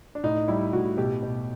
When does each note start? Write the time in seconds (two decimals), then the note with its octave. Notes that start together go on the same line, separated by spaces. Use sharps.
0.15 D4
0.23 A2 D#4
0.48 G3 E4
0.73 A2 F#4
0.97 B2 G4
1.23 B2